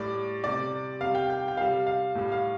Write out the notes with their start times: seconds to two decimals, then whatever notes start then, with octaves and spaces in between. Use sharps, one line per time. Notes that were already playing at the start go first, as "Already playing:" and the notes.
Already playing: A2 G3 D5
0.44 C3 G3 D5
1.01 C3 G3 F5
1.15 G5
1.30 G5
1.48 G5
1.57 C3 G3 F5
1.87 F5
2.15 A2 G3
2.32 F5